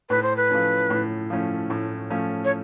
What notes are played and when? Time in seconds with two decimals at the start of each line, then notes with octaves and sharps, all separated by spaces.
0.09 A2 B4
0.23 C5
0.37 B4
0.50 F3 A3 C#4
0.90 A2
1.30 F3 A3 C#4
1.70 A2
2.10 F3 A3 C#4
2.45 C#5